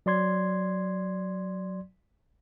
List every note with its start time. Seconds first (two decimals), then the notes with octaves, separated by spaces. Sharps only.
0.06 F#3 D5 C6 G#6